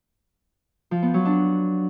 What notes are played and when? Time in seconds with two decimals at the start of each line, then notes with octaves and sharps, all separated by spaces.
0.91 F3
1.03 B3
1.14 F#3
1.25 D4